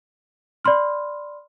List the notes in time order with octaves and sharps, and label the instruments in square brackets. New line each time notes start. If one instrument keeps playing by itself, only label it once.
[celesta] D5 B5 C6 F6